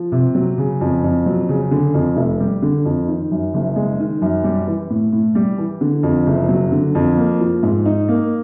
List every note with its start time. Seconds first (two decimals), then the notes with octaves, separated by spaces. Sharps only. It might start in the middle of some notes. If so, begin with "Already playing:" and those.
Already playing: F3
0.12 C3
0.35 F#3
0.58 C#3
0.81 F2
1.04 F2
1.26 F#3
1.49 C#3
1.71 D3
1.94 F2
2.17 F1
2.40 G3
2.62 D3
2.85 F2
3.08 D#3
3.31 F#2
3.54 F#1
3.76 G#3
4.00 D#3
4.22 F#2
4.44 G3
4.67 E3
4.90 A2
5.13 A2
5.35 G3
5.58 E3
5.81 D3
6.03 F2
6.26 F#1
6.49 F#3
6.72 D3
6.95 F2
7.17 A#3
7.40 F3
7.63 G#2
7.85 D#4
8.08 A#3